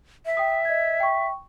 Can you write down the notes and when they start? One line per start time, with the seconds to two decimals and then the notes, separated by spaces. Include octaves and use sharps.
0.26 E5
0.37 G5 D#6
0.65 D#5 G#6
1.00 G5 C#6